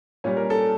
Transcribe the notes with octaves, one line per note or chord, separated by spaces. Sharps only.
A#2 G3 C#4
A#4
A4